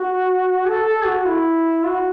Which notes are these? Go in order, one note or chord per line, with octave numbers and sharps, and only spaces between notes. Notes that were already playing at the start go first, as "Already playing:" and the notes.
Already playing: F#4
A4
A4
F#4
E4
F#4